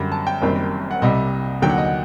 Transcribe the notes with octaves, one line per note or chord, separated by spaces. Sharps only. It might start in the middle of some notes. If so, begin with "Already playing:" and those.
Already playing: F#2 D3 G3
A5
G5
F#1 F#2 D#3 G3 C4
F#5
C2 C3 G3 D#5
D#2 D3 F#3 G5
F#5
D#5
F#5